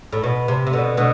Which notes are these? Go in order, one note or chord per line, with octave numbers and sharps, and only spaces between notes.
A2
B2
C3
C3
B2 D3
B2 D3